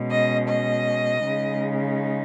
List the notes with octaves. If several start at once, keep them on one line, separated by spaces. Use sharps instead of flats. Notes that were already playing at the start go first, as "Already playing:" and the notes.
Already playing: B2 G#3 C#4
D#5
D#5
C#3 G#3 D#4